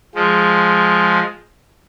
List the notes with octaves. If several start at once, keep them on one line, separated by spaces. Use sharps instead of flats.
F3 G#3